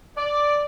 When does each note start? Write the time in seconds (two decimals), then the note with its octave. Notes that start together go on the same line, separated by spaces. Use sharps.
0.17 D5